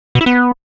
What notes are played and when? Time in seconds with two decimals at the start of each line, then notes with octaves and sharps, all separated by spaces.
0.15 B2
0.21 E4
0.26 B3